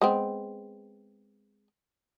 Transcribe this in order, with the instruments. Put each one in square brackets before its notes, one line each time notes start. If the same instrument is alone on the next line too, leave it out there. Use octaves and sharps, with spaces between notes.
[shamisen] G#3 B3 C4